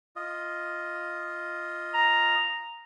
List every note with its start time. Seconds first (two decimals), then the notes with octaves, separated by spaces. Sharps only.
0.16 F4 D#5
1.94 A#5